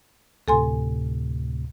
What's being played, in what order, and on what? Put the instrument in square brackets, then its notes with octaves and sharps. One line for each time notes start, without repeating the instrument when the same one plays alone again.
[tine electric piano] D2 A2 C3 [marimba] A4 G#5 C6